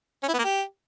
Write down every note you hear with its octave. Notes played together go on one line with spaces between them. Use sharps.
C#4
E4
B3
A#3
G4